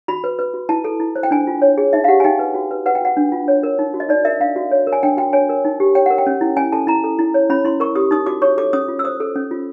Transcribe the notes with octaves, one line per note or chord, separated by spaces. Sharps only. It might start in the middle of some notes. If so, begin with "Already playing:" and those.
F#4 B5
B4
B4
F#4
E4 A5
A4
E4
C5
G5
D4 G#5
F4
C#5
G#4
D#4 E5
F5
G4 F#5
G#5
D#4 G5
B4
F#4
B4
B4 F#5
G5
F#4 F#5
D4
F4
C#5
A#4
D#4
F#4
D#5
D#4 D5
A#4 E5
D4 F5
F#4
C#5
A#4
G#5
D4 G5
F#4 G5
C#5 G#5
A#4
D#4
G4
C#5 G5
A#4 F#5
G5
C#4
E4
C#4 G#5
A4 A5
E4 A#5
A4
E4
C#5
C#4 B5
E4 C6
A#4 C#6
G4 D#6
D#4 D#6
F#4 D6
C#5 C#6
A4 D6
C#4 D#6
F4
E6
C5 D#6
A4
C#4
F4